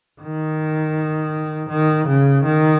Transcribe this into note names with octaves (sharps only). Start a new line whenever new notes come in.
D#3
D#3
C#3
D#3